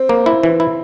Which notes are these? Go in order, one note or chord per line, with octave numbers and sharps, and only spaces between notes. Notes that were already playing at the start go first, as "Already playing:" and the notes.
Already playing: C4
A#3
E4
E3
E4